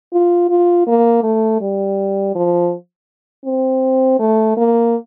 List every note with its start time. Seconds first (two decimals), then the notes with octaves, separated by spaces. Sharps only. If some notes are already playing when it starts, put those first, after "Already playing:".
0.13 F4
0.49 F4
0.87 A#3
1.23 A3
1.61 G3
2.35 F3
3.45 C4
4.19 A3
4.57 A#3